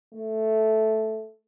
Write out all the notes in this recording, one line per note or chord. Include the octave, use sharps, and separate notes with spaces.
A3